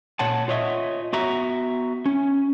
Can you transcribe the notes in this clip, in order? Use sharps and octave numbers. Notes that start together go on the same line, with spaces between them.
A#2 C#5 F#5 A5
F4 C#5 D#5 E5
B3 F#4 E5 A#5
C#4